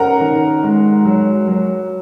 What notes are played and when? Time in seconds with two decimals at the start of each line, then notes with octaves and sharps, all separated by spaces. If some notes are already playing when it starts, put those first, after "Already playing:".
Already playing: C#4 A#4 F#5 A#5
0.21 D#3
0.63 G#3
1.05 F#3
1.48 F#3